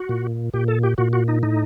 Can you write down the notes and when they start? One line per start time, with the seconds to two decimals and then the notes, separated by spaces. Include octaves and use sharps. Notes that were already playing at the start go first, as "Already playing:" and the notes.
Already playing: F#4
0.09 A#2
0.54 A#2 G4
0.68 A4
0.83 G4
0.98 A#2 F#4
1.13 F#4
1.28 D#4
1.43 A2 D#4